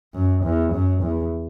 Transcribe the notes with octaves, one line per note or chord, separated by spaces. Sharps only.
F#2
E2
F#2
E2